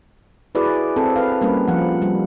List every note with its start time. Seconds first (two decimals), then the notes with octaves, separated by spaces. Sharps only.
0.55 E4 F#4 G#4 B4 D5
0.96 C4 A4
1.16 B4 F5
1.41 G3 A#3 C#4 B4
1.68 F3 F#5
2.02 G3